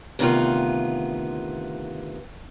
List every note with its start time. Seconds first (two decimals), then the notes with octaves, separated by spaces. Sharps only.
0.19 D2 C3 D#3 B3 F4